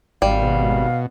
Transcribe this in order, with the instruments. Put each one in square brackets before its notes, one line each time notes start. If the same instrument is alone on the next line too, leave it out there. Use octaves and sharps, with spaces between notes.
[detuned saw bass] G#1 [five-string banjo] G3 [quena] F5
[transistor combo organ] B2